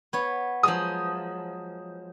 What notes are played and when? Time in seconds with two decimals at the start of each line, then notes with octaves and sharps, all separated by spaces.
0.13 B3 C#5
0.63 F3 F#3 G#3 D#6